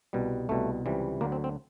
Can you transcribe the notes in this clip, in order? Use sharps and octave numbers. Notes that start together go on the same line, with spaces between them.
C2 B2 G3
C2 B2 G3 A3
C#2 C3 E3 G3
D2 D3 F#3 A#3
C4
C4